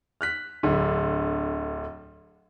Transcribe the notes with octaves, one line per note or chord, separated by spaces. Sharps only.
F6 F#6 B6
D1 D3